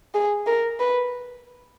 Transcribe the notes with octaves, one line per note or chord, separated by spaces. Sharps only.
G#4
A#4
B4